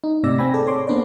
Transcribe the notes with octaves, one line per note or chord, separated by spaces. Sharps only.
D#4
G#1 A2 C3 D5 E6 A#6
C4 G5 G#5 B5 A#6
G#4 A4 D5
C#5 C6 D6
A#3 B3 D4 B4 C5 D5